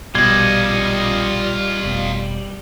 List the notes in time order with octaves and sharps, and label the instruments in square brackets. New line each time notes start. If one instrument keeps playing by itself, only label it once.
[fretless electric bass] A#1 B2 [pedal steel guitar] G3 [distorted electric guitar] F4 D#5 [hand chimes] G#6
[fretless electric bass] F1 B2